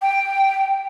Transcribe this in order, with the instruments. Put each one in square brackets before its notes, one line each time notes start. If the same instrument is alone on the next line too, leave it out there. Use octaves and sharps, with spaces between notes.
[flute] G5